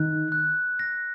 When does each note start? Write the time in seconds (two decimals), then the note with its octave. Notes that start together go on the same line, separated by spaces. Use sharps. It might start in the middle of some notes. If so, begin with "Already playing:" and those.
Already playing: D#3 D#4 F#6
0.32 F#6
0.79 A#6